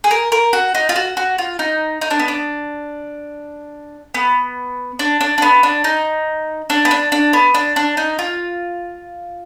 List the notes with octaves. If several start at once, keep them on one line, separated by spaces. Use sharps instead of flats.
G#4
A#4
A#4
F#4
D#4
F4
F#4
F#4
F4
D#4
D#4
D4
B3
D4
B3
D4
D4
D4
B3
D4
D#4
D4
B3
D4
D4
B3
D4
D4
D#4
F4